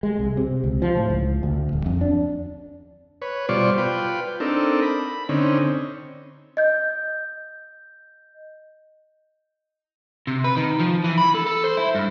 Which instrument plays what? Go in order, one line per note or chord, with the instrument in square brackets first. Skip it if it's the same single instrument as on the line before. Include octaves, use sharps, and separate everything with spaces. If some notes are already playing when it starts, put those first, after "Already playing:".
[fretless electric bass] G#3
C2
C3
C#2
F3
A2
C#2
D2
D#1
F2
D4
[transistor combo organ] B4 C#5
B2 G3 F4 C5 D5 C#6
F4 B4 G5
C4 D4 D#4 A4 A#4
B5
D3 C4 C#4 D#4
[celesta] D#5 G6
[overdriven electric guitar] C3
B4
D#3
F3
E3
B5
A4
A4
C5
E4
G2